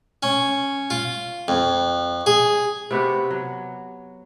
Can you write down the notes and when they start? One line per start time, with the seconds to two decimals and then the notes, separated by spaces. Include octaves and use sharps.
0.23 C#4
0.90 F4
1.48 F2
2.26 G#4
2.91 C3 B3 F#4 G4
3.30 F#3